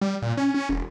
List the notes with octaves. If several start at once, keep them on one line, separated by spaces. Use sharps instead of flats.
G3
A#2
C#4
C#4
E1